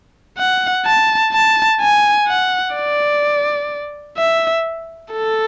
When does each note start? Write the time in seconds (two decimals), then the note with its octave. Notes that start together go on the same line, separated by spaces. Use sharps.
0.38 F#5
0.86 A5
1.32 A5
1.81 G#5
2.27 F#5
2.76 D5
4.18 E5
5.13 A4